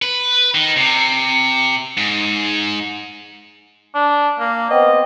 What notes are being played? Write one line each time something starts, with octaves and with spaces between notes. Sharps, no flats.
B4
D#3
C3
G#2
D4
A#3
B3 C4 D#5